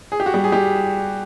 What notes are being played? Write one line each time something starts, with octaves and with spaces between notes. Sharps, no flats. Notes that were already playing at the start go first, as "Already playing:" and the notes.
G#4
G4
F#4
G3 G4
G#4
G3 G4